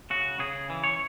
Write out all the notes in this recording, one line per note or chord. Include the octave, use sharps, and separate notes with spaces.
C#3 F#4
C#3 G#4
E3
C#5